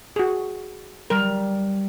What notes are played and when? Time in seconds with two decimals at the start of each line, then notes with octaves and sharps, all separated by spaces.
0.16 F#4 G#4
1.10 G3 A#4